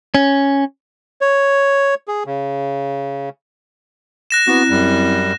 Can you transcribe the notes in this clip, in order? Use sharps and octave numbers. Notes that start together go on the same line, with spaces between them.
C#4
C#5
G#4
C#3
F#6 A#6 E7
B3 C4 E4 F#4
F#2 G3